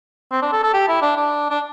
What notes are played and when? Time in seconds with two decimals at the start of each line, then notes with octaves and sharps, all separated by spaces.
0.32 C4
0.42 D4
0.52 A4
0.63 A4
0.74 G4
0.88 E4
1.02 D4
1.16 D4
1.51 D4